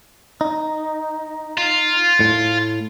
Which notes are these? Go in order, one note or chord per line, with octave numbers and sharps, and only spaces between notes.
D#4
F4
A2